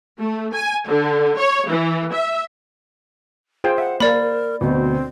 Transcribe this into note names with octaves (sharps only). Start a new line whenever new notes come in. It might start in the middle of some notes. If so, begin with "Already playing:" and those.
A3
G#5
D3
C#5
E3
E5
F4 G#4 C5 G5
E5 F#5
A#3 A#4 D5 B5
D2 B2 C4